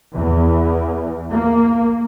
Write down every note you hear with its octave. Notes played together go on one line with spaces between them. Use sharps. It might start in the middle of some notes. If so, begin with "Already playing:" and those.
E2
A#3